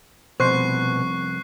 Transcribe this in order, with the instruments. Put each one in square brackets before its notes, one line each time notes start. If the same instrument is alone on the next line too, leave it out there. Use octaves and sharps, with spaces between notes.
[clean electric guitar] C2 F2 B3 [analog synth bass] B2 [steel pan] C5 [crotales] C#6 F#6 C7